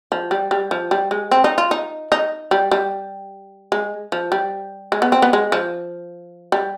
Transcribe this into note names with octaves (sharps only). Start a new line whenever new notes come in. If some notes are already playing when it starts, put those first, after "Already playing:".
F3
G3
G3
F3
G3
G#3
C4
D#4
F4
D#4
D#4
G3
G3
G#3
F3
G3
G#3
B3
C4
B3
G#3
F3
G3